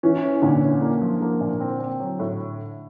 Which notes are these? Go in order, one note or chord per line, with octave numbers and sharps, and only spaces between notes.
E3 C#4
C#4
A#2 D3
C#4
A#3
F3
A#3
A#2
C4
C4
F#3
A2